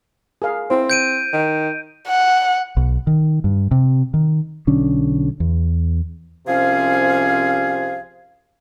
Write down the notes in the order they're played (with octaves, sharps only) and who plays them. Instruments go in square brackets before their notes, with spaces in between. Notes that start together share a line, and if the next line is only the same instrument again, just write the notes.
[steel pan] G#4 A#4 F5
[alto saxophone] C4 [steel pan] E4 C5
[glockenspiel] G6 D7 D#7
[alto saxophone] D#3
[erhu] F#5
[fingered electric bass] B1
D#3
G2
C3
D#3
B1 D3 C#4
E2
[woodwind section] C2 C3 F3 C#4 G#4 F5